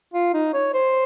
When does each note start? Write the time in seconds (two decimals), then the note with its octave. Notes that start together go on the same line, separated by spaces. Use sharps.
0.14 F4
0.34 D#4
0.54 C#5
0.74 C5